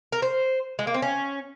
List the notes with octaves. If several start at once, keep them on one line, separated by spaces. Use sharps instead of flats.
A#4
C5
G#3
A#3
C4
C#4